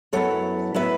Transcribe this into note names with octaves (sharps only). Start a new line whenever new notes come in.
F#2 F#3 B3 E4 A4 C#5
A2 F#3 B3 E4 B4 E5